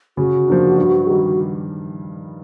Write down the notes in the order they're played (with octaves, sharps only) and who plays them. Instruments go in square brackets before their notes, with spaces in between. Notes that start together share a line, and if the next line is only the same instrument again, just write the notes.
[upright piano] C#3 [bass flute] F#4
[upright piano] F3 A#3 D4
G2
D#3 G3